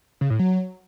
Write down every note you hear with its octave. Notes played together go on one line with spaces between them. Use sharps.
C#3
A2
F#3